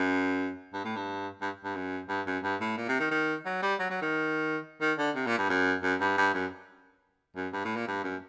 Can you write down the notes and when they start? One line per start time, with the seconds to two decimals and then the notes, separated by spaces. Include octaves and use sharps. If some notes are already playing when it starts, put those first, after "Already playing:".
Already playing: F#2
0.73 G2
0.85 A2
0.96 G2
1.41 G2
1.64 G2
1.75 F#2
2.09 G2
2.26 F#2
2.43 G2
2.61 A2
2.77 A#2
2.89 C3
3.00 D#3
3.11 D#3
3.46 F#3
3.63 G3
3.79 F#3
3.90 F#3
4.02 D#3
4.81 D#3
4.98 D3
5.15 C3
5.26 A#2
5.38 G2
5.50 F#2
5.83 F#2
6.01 G2
6.17 G2
6.34 F#2
7.36 F#2
7.53 G2
7.65 A2
7.76 A#2
7.88 G2
8.04 F#2